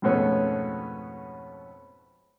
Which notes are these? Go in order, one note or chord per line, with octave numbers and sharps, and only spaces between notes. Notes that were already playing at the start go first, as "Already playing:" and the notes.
F2 G#2 B2 A3 B3 C#4